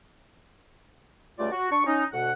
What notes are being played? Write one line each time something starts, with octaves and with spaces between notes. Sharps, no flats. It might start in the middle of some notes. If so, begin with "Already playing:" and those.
C#2 G3 A3 F4 D5
F#4
D4 C#6
C#4 D#4
D2 B2 F#5